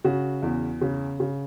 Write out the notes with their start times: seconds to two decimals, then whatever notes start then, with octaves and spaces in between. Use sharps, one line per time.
0.04 C#3 F#4
0.42 E2
0.81 C#3
1.20 C#3